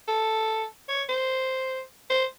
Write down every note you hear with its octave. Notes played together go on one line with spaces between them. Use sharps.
A4
C#5
C5
C5